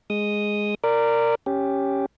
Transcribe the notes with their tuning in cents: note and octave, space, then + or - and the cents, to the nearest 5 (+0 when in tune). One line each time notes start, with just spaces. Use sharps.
G#3 +0 D#6 +0
A#4 -15 D5 +0
C#4 +0 G4 +0